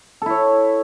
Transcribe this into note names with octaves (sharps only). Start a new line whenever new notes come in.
E4 A4 C#5